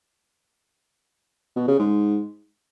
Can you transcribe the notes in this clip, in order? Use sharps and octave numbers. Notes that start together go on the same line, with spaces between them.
B2
C#3
G#2